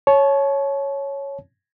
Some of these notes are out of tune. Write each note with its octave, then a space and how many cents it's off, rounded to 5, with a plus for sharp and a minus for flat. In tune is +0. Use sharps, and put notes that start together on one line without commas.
C#5 +0 A5 -35